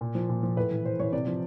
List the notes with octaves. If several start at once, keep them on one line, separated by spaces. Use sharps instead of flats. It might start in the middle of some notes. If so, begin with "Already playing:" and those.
A#2
F3
A#2
F3
A2 B4
E3
A2 C5
E3 C#5
C3 D5
F3